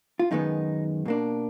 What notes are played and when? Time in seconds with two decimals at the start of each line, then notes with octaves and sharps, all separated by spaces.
0.19 F4
0.31 F#2 D#3 G#3 B3 D#4
1.06 B2 A#3 D4